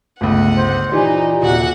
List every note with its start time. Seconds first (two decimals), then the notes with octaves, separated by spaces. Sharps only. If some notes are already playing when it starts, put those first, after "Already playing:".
0.21 G1 C#2 A3 F#5
0.56 C5
0.92 A#2 E3 D#4 G4
1.42 D#1 C3 F#4 F#5